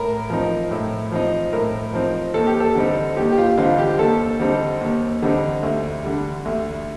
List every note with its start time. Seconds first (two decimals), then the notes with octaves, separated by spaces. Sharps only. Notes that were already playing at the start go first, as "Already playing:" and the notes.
Already playing: A2 A#4
0.30 F3 C4 D#4
0.71 A2
1.12 F3 C4 D#4
1.53 A2 A#4
1.93 F3 C4 D#4
2.34 D#2 A4
2.47 G4
2.60 A4
2.75 D3 G3 C4 D#4
3.17 D#2 G4
3.32 G4
3.38 F4
3.58 D3 G3 C4 D#4 F4
3.78 G4
3.99 D#2 A4
4.40 D3 G3 C4 D#4
4.81 D#2
5.22 D3 G3 C4 D#4
5.63 D2
6.03 D3 G3
6.45 D2